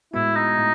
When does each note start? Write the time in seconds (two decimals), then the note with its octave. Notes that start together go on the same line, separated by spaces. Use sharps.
0.14 A2 G#3 B3 E4 F#4
0.36 D#4
0.59 A2